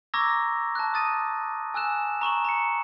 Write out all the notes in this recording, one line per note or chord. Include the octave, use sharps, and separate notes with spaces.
A#5 C#6 D6 E6 G#6 A#6
A5 F#6
D#6 A6 D#7
G#5 E6 F#6 E7
A#5 C#6 E7 F#7
A#5 C#7